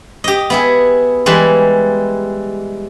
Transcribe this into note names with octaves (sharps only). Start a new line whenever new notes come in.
G4 D#5
B3 E4 G#4
E3 G3 G#3